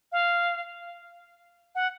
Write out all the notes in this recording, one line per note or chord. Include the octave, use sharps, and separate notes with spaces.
F5
F#5